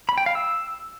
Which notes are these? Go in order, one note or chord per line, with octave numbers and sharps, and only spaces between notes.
B5
G5
F5
E6